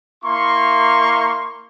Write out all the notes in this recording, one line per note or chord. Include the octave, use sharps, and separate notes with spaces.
A#3 E4 A#5 C6 C#6